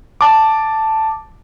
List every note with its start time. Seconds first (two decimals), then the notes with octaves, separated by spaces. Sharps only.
0.21 A5 D6